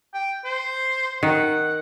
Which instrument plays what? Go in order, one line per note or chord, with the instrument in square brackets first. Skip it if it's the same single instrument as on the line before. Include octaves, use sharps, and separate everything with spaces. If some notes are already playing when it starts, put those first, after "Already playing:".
[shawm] G5
C5
[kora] D#3 [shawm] F#5